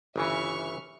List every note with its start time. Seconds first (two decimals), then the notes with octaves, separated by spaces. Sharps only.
0.16 G1 C#3 E3 E5 C#6 F6